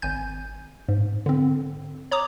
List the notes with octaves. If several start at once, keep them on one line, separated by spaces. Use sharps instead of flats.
G#1 G#5 G6
G#2
D3 C4
C#5 A#5 D6 D#6